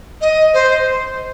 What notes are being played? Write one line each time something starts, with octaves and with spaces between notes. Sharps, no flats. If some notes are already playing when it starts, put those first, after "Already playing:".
D#5
C5